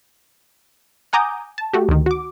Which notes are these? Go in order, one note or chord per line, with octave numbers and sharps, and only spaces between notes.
F#5 G#5 A#5 D6 D#6 G6
A5
A3 F#4 G4
D2 D#3
F#4 D6